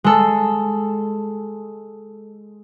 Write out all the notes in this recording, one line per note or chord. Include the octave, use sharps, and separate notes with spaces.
G#3 A4